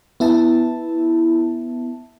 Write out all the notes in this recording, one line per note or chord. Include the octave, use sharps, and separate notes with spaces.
B3 E4 E5 A5